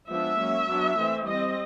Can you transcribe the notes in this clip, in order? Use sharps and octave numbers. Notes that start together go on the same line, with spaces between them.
F3 G#3 B3 D4 E5
F#3 A#3 C#4
F#3 B3 D4
E3 A3 C4
G3 C4 D#5